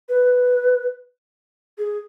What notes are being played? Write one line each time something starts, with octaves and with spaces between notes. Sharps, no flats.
B4
G#4